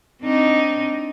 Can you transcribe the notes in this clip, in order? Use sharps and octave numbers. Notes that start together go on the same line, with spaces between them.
C4 D4 D#4